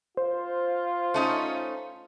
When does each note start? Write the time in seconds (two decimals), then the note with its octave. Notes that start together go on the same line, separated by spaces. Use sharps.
0.17 F4 C5
1.14 A3 C#4 D#4